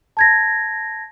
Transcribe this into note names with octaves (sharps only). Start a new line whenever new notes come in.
A5 G#6 A#6